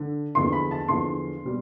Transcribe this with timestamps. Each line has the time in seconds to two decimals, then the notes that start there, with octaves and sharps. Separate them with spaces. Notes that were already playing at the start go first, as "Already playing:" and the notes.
Already playing: D3
0.35 E2 D3 F3 C6
0.53 B5
0.71 A5
0.88 E2 D3 F3 C6
1.44 B2 G3